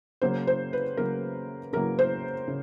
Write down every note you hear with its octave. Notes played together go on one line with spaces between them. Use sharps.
C#3 F#3 A#3 C5
C5
B4
C#3 F#3 A#3 A#4
C#3 F#3 A#3 A#4
C5
C#3